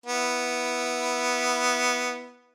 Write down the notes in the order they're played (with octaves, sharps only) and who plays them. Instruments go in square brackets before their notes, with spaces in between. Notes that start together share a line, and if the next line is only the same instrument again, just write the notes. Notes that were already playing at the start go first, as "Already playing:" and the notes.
[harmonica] B3 E4